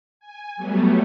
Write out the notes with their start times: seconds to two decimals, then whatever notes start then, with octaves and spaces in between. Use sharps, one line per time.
0.20 G#5
0.56 F#3 G3 A3 B3